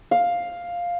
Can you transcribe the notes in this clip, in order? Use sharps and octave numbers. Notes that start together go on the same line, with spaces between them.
F5